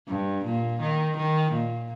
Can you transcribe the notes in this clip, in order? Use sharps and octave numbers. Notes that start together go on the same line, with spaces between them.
G2
A#2
D#3
D#3
A#2